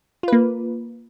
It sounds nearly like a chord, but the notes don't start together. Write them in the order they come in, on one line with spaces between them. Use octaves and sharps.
F4 B4 A#3